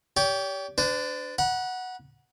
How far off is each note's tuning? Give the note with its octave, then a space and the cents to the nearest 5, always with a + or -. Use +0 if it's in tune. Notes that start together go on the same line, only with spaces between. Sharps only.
G4 +0 C#5 +45
D4 +0 C5 -45
F#5 +0 B5 -40